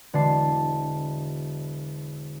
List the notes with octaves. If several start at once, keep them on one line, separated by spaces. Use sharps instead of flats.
E1 D3 F#4 D5 A5 C7